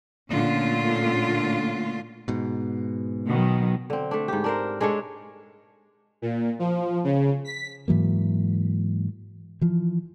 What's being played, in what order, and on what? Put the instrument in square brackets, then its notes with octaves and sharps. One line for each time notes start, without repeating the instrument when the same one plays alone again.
[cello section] A#2 D3 A3 C#4 F4
[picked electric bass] G#2 B2
[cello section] B2 D#3 F#3
[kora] D3 C4
A3 D4
G#2 G4
D4 A#4 C5
G#3 D4 A4 C#5
[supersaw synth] A#2
F3
C#3
B6
[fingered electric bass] G#2 E3 F#3 A#3
E3 F3